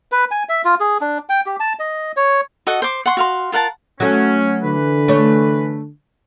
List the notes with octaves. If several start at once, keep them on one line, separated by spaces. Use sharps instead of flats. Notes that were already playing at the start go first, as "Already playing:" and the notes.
B4
G#5
E5
F4
G#4
D4
G5
G4
A5
D#5
C#5
F#4 A4 D#5 F#5
C5 D6
F#5 C6 C#6
F#4 F5 C6
F4 A#4 F#5 A5
F#3 A3 C#4
D3 E3 B4
A3 C#5